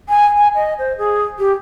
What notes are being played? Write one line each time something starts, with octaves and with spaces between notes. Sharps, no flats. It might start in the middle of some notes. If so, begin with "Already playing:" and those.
G#5
G#5
D#5
C5
G#4
G4